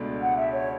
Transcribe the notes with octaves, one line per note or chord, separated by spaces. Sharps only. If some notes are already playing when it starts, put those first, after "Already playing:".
Already playing: C#2 B2 A3 D4
F#5
E5
C#5